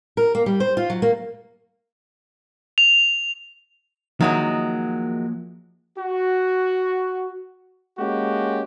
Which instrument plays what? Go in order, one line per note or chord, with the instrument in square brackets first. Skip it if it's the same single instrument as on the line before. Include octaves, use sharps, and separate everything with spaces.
[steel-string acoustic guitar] A#4
A#3
G3
C5
F4
F#3
A#3
[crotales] F7
[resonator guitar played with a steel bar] D#3 F#3 G#3 [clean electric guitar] F3 A#3 E5
[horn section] F#4
G#3 A#3 C#4 F#4 G4